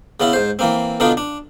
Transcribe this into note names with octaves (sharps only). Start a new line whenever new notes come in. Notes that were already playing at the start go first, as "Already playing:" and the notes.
C#3 B3 C#4 E4
G#2 C5
E3 A#3 C4
B2 D3 B3 D4 D#4 F4
D4